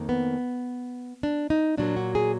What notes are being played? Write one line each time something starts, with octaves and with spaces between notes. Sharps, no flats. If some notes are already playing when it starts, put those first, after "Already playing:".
Already playing: F2 D#3 A#3
B3
D4
D#4
A#2 F#3 A#3 D4
F#4
G#4